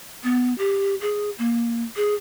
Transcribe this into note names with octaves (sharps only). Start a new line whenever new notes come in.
B3
G4
G#4
A#3
G#4